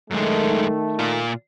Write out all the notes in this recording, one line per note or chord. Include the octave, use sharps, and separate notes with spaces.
F#2 D#3 G#3 A3
A#2 F4